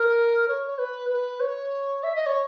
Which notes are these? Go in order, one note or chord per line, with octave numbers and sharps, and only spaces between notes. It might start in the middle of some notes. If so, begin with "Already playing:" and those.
Already playing: A#4
C#5
C#5
B4
B4
C#5
E5
D#5
C#5